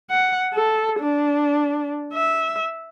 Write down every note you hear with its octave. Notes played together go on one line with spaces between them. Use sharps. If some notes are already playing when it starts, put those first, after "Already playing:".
F#5
A4
D4
E5